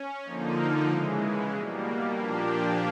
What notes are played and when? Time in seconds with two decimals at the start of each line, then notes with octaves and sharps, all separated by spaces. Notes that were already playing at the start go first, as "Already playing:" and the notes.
Already playing: C#4
0.23 D3 F3 A#3 D#4
0.88 C#3 E3 G#3
1.53 B2 G3 A#3
2.18 A#2 F3 A#3 D4 G4